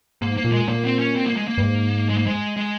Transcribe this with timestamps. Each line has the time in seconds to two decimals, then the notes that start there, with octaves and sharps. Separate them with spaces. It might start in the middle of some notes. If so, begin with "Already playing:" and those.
0.21 G#2 A#3
0.37 A#3
0.44 A#2
0.52 G#3
0.68 A#2 A#3
0.84 C4
0.99 C#4
1.15 C4
1.26 A#3
1.37 G#3
1.48 A#3
1.58 G2
1.62 G#2
2.09 G#3
2.18 A#3
2.26 G#3
2.57 G#3